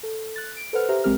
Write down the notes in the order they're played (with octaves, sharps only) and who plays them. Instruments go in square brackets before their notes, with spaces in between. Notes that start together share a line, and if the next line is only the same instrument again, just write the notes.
[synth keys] A4
F#6 A6
D7
A4 B4 C5 F#5 F6
G4 C5 E5 A#5
A#1 G#3 C4 G4 A#4 F6